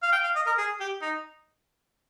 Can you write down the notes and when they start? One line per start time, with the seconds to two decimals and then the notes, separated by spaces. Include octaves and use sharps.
0.03 F5
0.12 G5
0.24 F5
0.36 D#5
0.47 A#4
0.58 G#4
0.80 G4
1.02 D#4